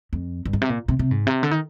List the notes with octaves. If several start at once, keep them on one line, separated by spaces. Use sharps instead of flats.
F2
G2
G#2
C3
A#2
C3
C3
G#2
C3
D3
D#3